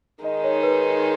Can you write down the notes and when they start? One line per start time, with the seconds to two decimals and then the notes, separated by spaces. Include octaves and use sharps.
0.24 D#3 G#3 D#4 D#5
0.44 C#5
0.63 B4